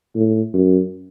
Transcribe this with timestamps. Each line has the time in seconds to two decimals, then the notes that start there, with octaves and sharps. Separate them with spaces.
0.15 A2
0.53 F#2